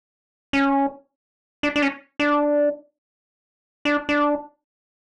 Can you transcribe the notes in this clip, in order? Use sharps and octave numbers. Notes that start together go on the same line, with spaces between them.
C#4
D4
D4
C#4
D4
D4
D4